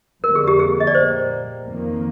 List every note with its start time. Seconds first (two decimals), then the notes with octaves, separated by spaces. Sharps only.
0.23 F2 D3 G3 A#3 A#4
0.35 G#4
0.48 G4
0.59 G#4
0.80 D#5
0.87 D5
0.94 A#2 G3 A#3 C5
1.65 F2 D#3 A#3